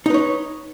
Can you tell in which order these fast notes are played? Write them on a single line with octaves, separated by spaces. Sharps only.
D#4 B4 C#5